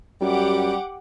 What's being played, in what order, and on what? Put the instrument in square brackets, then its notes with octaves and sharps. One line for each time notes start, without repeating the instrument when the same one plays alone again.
[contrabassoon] F#2 [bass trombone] G3 [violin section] G4 F#5 D6